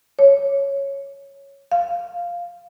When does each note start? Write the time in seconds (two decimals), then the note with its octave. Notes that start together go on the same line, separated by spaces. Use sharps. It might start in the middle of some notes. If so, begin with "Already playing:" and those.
0.19 C#5
1.72 F5